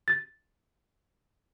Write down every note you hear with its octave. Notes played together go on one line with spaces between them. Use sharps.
A6